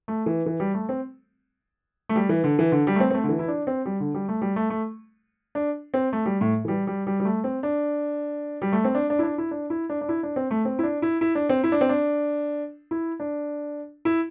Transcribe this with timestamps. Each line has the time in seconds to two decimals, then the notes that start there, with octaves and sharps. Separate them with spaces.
0.08 A3
0.26 E3
0.46 E3
0.60 G3
0.74 A3
0.89 C4
2.09 A3
2.16 G3
2.29 E3
2.44 D3
2.59 E3
2.72 D3
2.87 G3
2.96 A3
3.00 C4
3.10 C4
3.14 A3
3.24 D3
3.29 E3
3.39 E4
3.48 D4
3.67 C4
3.85 G3
4.00 D3
4.14 G3
4.28 A3
4.42 G3
4.56 A3
4.70 A3
5.55 D4
5.94 C4
6.13 A3
6.26 G3
6.41 A2
6.65 E3
6.68 G3
6.87 G3
7.07 G3
7.20 G3
7.25 A3
7.44 C4
7.63 D4
8.62 G3
8.72 A3
8.84 C4
8.95 D4
9.10 D4
9.19 E4
9.23 D4
9.38 E4
9.51 D4
9.70 E4
9.90 D4
10.01 D4
10.09 E4
10.23 D4
10.36 C4
10.51 A3
10.65 C4
10.79 E4
10.83 D4
11.02 E4
11.21 E4
11.35 D4
11.49 C4
11.64 E4
11.72 D4
11.81 C4
11.89 D4
12.91 E4
13.20 D4
14.05 E4